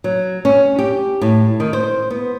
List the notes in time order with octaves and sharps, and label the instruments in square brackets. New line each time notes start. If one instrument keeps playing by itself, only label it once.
[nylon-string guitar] F#3
C#4
G4
A2
D#3
C5
B3